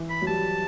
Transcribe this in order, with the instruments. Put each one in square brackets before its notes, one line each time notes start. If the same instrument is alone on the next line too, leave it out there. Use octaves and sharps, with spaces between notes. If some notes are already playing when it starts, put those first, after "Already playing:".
Already playing: [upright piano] E3
[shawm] B5
[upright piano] F#3
[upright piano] G3 [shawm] A5